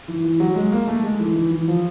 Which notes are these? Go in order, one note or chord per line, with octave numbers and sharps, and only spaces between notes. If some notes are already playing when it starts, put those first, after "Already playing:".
E3
E3
F#3
G#3
A#3
A3
G#3
E3
E3
E3
F3